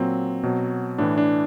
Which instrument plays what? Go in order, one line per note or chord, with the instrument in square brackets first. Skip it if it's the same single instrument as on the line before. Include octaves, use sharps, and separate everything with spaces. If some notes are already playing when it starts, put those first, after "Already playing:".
Already playing: [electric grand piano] A#2 F#3 C4
B2 F#3
A2 E3 D4
D4